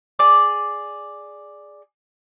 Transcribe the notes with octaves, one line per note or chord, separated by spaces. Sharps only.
G#4 D5 D6